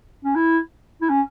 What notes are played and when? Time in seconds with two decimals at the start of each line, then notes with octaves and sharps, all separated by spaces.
0.25 C#4
0.36 E4
1.02 E4
1.10 C#4